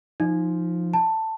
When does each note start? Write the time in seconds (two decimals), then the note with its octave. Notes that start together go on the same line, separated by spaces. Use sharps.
0.20 F3 D#4
0.94 A5